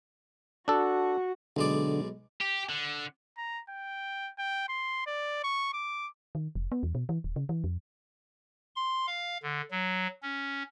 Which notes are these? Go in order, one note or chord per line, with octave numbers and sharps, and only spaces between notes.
D4 F#4 A4
B1 D3 G#3 D5
G4
D3
A#5
G5
G5
C6
D5
C#6
D6
D#3
F1
B3
E2
B2
E3
D#1
C#3
E3
F2
C6
F5
D3
F#3
C#4